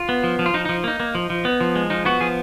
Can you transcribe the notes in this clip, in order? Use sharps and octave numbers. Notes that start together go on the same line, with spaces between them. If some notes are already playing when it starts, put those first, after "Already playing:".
Already playing: F4
B3
F3
F3
F4
F3 D#4
F3 D#4
A#3 D#4
A#3
F3
F3
B3
F3
G#3
F3 D#4
B3 F#4
F3 G#4